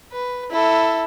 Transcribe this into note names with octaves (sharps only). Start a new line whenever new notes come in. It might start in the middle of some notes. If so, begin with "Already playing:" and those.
B4
E4 A4